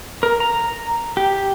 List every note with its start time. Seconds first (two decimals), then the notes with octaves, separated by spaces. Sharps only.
0.23 A#4
0.40 A#5
1.17 G4